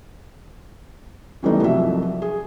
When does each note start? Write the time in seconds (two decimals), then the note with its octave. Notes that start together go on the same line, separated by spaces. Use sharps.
1.43 C#3 E3 G3 A3 B3 D#4
1.62 C2 F3 F#3 E5
2.22 G#4